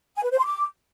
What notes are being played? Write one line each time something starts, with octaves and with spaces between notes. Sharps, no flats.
G#5
B4
C5
C6
D6